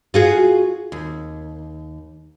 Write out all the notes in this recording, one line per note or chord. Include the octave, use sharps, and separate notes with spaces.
F4 F#4 G#4
D#2